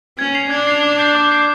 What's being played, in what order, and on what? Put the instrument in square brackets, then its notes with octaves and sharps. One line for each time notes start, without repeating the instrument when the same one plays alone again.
[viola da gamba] C#4 [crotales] G#6
[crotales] C7 F7
[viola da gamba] D4 [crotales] G#6
[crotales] C7 F7
D6
G6 C7
D6
G6 C7